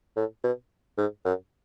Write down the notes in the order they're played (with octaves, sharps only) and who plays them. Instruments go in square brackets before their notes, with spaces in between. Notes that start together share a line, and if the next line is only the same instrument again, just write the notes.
[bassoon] A2
B2
G#2
F#2